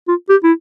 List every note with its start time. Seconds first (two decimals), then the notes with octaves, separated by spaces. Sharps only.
0.08 F4
0.29 G4
0.44 E4